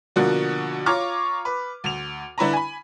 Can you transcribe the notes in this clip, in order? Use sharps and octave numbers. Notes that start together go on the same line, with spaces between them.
B2 D3 F3 A#3 F#4
F4 C#5 A#5 C#6 D6 F6
B4
D2 F7
D3 E4 B4 A#5
G#5 B5